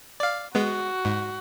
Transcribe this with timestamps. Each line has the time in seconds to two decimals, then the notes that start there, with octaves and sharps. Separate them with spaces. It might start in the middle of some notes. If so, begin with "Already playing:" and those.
0.20 D5 F5
0.55 G#3 B3 F#4
1.05 G#2